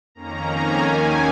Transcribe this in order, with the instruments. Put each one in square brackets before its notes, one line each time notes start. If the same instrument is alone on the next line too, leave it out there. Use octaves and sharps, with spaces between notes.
[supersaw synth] F2 D#3 A#3 C#4 A#5
G#5
D#2 D#3 A#3 C#4